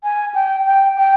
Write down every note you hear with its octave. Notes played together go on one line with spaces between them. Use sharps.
G#5
G5
G5
G5